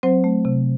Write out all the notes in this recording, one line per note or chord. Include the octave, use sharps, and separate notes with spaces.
F#3 C4 C5
A3
C3